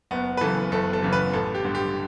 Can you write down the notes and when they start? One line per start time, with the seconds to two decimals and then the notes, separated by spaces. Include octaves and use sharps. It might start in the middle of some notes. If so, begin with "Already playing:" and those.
0.11 F#1 B3
0.37 B4
0.41 F#2 C#3 E3 A4
0.72 F#1 A4
0.93 A4
1.02 F#2 C#3 E3
1.13 B4
1.33 A1 A4
1.55 G4
1.65 G2 D3
1.75 G4